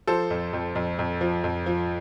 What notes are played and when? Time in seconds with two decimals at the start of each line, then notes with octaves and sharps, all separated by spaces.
0.07 F3 A4 C5
0.30 F2
0.53 F2
0.75 F2
0.99 F2
1.21 F3
1.44 F2
1.66 F3